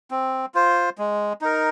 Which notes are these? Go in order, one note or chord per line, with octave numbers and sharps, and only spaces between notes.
C4
F4 C5
G#3
D#4 A#4